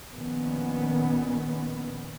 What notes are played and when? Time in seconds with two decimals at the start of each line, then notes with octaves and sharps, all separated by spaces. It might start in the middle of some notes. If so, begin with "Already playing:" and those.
0.12 A#1 A#2 D#3 B3 C#4